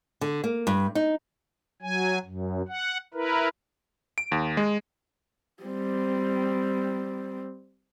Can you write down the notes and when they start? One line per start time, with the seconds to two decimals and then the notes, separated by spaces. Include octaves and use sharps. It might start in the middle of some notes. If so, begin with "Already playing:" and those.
0.21 D3
0.44 A#3
0.67 G2
0.95 D#4
1.82 F#3 G#5
2.25 F#2
2.68 F#5
3.14 E4 A#4 B4
4.18 D7
4.32 D#2
4.57 G#3
5.63 G3 C4